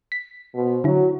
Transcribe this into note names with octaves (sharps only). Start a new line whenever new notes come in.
B6
B2 C5
D3 F#3 E4